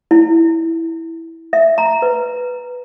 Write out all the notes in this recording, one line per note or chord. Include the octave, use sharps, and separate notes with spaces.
E4
E5
A#5
B4